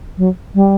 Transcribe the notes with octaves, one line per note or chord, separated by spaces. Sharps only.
F#3
G3